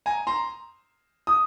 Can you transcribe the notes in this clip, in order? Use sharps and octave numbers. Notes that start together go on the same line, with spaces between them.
G#5 A#5
A#5 C6
D#6